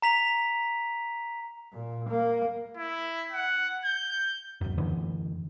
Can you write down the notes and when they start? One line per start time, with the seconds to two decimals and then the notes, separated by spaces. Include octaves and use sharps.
0.02 A#5 B6 F7
1.73 A#2
2.10 A#3
2.77 E4
3.32 F#5
3.84 G6
4.61 D1 F#2
4.78 F#2 D3 E3